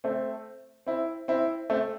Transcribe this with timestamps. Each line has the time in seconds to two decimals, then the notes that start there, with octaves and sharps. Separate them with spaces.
0.04 A3 C4
0.86 C4 E4
1.28 C4 E4
1.70 A3 C4